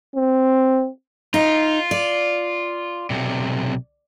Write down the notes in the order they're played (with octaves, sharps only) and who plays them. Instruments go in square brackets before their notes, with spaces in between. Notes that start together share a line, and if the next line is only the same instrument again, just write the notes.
[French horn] C4
[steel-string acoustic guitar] D#4 [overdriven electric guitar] F4
[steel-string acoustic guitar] D5
[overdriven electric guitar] B1 C3